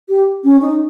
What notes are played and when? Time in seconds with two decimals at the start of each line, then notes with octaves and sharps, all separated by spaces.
0.09 G4
0.44 C#4
0.62 D#4